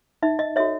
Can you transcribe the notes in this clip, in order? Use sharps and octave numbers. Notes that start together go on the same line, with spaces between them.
D#4 E5
D#5
F#4 A4 C#5 E5